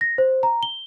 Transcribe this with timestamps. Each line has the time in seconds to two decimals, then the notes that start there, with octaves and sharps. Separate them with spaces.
0.01 A#6
0.18 C5
0.43 A#5
0.63 G7